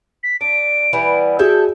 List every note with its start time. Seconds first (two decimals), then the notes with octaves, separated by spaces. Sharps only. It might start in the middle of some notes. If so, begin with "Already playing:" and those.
0.23 B6
0.41 D4 D7
0.93 E3 G3 B3
1.39 F#4 G#4 A4 D5 E5 G6